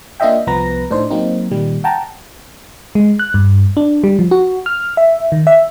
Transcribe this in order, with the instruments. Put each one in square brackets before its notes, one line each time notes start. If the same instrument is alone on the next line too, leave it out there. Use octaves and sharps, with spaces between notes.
[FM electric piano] A#3 D4 F4 D#5 E5 G5
C2 F3 B3 B4 A#5 A#6
A2 D4 D#4 C5
F#3 A#3 C4 D#4
A#2 D#3 G3
F#5 G5 A5 A#5
G#3
F#6
G2
D4
G3
F3
F#4
F6
E5
D#3
E5